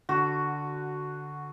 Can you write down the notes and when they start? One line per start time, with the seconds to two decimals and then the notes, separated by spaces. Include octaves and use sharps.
0.09 D3 F#4